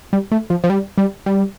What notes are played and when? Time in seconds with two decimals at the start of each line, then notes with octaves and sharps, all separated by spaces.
0.13 G3
0.32 A3
0.50 F3
0.64 F3
0.70 G3
0.98 G3
1.26 G3